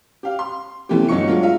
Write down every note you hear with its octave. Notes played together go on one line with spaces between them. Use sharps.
G4 F5
C6
C3 E3 A3 B3 C#4 G4
G1 F#3 D#4 C#6 C#7
F#3 G#3 D4 F4 F#4
F4 E5 F5